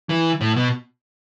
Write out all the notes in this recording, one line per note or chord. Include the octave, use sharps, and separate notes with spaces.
E3
A2
B2